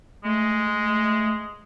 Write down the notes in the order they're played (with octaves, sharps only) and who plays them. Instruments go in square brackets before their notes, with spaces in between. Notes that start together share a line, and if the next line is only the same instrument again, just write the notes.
[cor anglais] G#3 [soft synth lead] A3